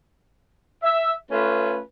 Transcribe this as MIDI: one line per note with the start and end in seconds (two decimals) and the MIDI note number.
0.83 1.13 76
1.32 1.79 57
1.32 1.79 61
1.32 1.79 65
1.32 1.79 71